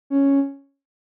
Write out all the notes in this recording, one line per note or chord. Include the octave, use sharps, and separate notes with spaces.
C#4